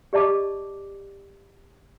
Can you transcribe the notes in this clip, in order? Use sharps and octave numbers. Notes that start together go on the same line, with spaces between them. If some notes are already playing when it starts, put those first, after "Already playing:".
G4 D5 D#5 A5 D6